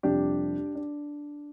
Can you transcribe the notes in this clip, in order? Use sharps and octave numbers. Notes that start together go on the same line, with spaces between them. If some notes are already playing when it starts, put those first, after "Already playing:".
F2 C3 G3 D4 G4
D4